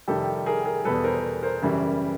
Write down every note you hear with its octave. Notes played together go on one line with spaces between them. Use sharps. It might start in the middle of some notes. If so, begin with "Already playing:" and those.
F2 C3 D#3 G3 G4 A4
G#4 A#4
G#4 A#4
E2 B2 G3 A4 B4
A#4 C5
A#4 C5
F#2 C#3 E3 G3